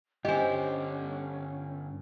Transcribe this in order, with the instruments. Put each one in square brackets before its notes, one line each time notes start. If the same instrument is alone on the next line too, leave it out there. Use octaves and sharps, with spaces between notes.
[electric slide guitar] G2 D3 [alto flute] C#4 [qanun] G4 C5 [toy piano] D#5 G#5